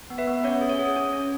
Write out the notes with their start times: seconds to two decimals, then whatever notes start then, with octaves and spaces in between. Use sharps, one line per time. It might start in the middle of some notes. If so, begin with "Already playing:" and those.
0.10 B3
0.18 B4 E5
0.27 B3
0.44 C#4 C#5 F#5
0.61 G#4
0.69 C#5
0.79 G#4
0.96 C#4 C#5
1.13 C#4